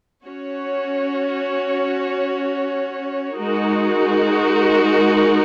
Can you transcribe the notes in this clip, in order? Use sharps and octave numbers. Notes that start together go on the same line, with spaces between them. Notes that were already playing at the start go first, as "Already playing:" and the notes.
C#4 F#4 C#5
G#3 D#4 F#4 A#4